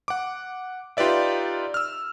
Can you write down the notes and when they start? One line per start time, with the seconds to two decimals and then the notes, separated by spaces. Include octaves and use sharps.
0.08 F#5 D6
0.97 D#4 F4 G4 B4 D5 E5
1.74 E6 F6